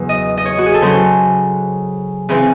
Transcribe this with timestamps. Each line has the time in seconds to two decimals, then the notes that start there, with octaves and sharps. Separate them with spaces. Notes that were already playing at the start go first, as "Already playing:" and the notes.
Already playing: E2 C#3 F#3
0.09 D#5
0.37 D#5
0.45 C#5
0.58 F#4
0.66 G#4
0.74 A4
0.82 C#3 F#3 C#4 C5
2.29 C#3 E3 C4 D#4 G#4